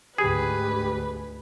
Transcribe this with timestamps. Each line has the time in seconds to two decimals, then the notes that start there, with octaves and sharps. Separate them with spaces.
0.18 D2 G#2 G4 G#4 B4